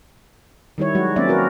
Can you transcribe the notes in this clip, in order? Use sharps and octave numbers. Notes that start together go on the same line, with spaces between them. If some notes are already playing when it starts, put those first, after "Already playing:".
D#3 G3 E4 C#5
F#3 G#3 F#4
F#3 A#3 C4 C#4 D5 E5
C4 F#4 A#4 B4